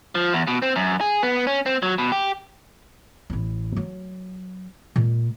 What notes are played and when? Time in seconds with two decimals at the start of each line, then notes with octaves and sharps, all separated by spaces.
0.15 F3
0.33 E2
0.47 B2
0.62 C4
0.76 F#2
1.01 G#4
1.23 B3
1.47 C#4
1.66 C4
1.83 F#3
1.98 B2
2.12 G4
3.30 A1 E4
3.77 F#3
4.96 A#2 G#3